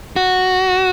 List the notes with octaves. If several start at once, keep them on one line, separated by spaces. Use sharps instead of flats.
F#4